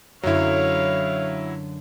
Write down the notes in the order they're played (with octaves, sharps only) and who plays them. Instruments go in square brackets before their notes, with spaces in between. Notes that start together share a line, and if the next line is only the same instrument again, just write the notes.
[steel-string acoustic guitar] F#2 D3 [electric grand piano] F#3 E4 [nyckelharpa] C#5 F5